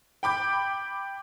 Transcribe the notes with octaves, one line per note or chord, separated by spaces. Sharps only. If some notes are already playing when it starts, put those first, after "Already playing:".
G5 B5 D6 G6